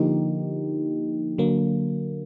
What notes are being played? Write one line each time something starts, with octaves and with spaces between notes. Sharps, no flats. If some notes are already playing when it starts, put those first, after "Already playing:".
Already playing: D3 F3 A#3 D#4 G4
D3 F#3 A#3